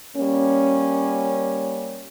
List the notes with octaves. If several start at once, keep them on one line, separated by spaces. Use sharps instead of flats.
G3 A#3 C#4